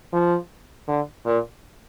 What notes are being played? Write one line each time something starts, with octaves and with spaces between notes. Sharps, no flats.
F3
D3
A#2